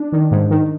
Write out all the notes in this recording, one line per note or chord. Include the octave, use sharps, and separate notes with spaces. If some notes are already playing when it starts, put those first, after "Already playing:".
Already playing: D4
D#3
G#2
D#3